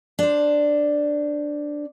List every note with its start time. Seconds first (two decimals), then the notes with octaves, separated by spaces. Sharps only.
0.19 D4 C5